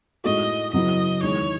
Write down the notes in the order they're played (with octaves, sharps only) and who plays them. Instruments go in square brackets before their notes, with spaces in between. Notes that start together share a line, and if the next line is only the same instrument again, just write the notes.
[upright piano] A2 G#3 D#4 F#4 A4 [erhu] D#5
[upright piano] C#3 F#3 B3 E4 [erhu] D#5
[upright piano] E2 D#3 G#3 D#4 [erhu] C#5